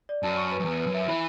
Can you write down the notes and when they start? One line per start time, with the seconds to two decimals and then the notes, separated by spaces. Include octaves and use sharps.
0.09 D5
0.23 F#2 A5
0.37 C#6
0.52 B4
0.60 F#2
0.65 E2 B4
0.80 B4
0.87 F#2
0.94 E5
1.08 E3 B5